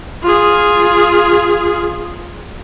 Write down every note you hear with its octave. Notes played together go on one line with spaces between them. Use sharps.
F4 G#4